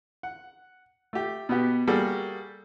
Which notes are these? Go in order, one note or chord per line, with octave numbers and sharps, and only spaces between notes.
F#5
A3 G4
B2 B3 G4
G3 A#3 F#4 G#4 A4